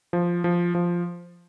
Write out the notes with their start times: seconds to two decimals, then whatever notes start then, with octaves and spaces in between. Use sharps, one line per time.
0.13 F3
0.44 F3
0.75 F3